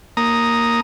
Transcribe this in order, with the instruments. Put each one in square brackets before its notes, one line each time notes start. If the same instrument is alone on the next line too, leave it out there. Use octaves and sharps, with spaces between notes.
[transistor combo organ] A#3 A#5 D#6